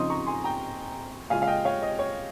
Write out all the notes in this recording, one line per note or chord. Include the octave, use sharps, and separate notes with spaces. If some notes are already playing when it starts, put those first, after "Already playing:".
Already playing: C#3 F3 C4 D#4 C6 D#6
A#5 C#6
G#5 C6
G5 A#5
C#3 G#3 C#4 F4 F5 G#5
F5
D#5 G5
C#5 F5
D#5
C#5